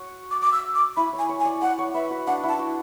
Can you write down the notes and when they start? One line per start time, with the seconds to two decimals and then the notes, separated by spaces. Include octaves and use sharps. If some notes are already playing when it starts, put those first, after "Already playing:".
Already playing: F#4 C#5
0.31 D6
0.41 D6
0.52 E6
0.75 D6
0.96 E4 B5
1.13 C#5
1.19 G#5
1.29 C#5
1.40 G#5
1.45 D5
1.62 D5 F#5
1.79 C#5
1.94 B4 E5
2.11 F#4
2.27 D4 F#5
2.43 E4
2.49 A5
2.59 F#4